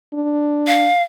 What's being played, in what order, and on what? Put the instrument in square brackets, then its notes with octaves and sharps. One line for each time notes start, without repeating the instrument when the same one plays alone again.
[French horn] D4
[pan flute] F5